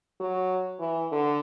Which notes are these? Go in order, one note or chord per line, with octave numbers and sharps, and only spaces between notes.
F#3
E3
D3